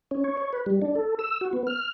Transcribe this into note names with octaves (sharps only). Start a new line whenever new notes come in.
C#4
C#5
C#5
B4
G3
D4
A4
E6
F#4
B3
F6